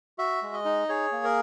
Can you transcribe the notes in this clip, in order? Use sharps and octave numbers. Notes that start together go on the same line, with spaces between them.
F#4 E5
G#3
D#5
D#4
G#4 C#5
A#3
A#4